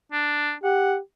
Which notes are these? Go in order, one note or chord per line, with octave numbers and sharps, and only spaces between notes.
D4
G4 F#5